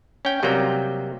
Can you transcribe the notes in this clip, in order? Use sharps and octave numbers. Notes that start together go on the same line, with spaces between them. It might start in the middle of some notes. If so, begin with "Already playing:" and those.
C#4 G5
C3 F#3 G3 A#3 G5